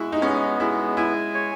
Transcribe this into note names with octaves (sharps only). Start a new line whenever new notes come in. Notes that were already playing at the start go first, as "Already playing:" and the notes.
Already playing: G#3 E4 F#4
D#4
B3 C#4
G#3 E4
E4 G#5
C#5